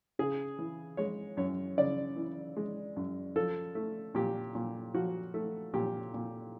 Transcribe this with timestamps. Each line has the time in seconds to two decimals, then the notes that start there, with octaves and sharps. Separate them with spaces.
0.19 C#3 G#4
0.59 E3
0.97 G#3 C#5
1.37 F#2 C#5
1.78 C#3 D5
2.17 E3
2.57 G#3
2.96 F#2
3.36 F3 A4
3.75 A3
4.15 A#2 G4
4.55 A#2
4.94 F3 F#4
5.34 A3
5.74 A#2 G4
6.14 A#2